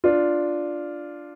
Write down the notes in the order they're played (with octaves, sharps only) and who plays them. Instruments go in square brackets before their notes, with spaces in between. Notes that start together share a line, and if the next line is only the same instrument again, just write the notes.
[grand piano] D4 F4